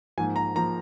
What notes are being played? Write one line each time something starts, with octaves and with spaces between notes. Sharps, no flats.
G#2 F3 A#3 G#5
A#5
F3 A#3 A#5